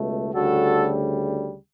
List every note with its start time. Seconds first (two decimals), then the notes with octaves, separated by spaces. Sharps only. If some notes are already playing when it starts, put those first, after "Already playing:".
Already playing: C#2 B2 A3
0.33 D2 C#3 G3 F#4 A4